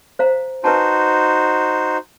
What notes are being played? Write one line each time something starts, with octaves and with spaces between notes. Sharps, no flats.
C5 F5 A#5
D#4 F#4 B4 C5 G#5 A5